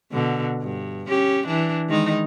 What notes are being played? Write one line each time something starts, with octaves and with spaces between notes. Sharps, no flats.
B2 D3
G2
C#4 G4
E3 D4
D#3 G#3 D#4